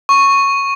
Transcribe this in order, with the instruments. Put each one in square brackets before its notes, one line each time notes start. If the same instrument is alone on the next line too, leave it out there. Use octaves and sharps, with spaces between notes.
[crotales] C#6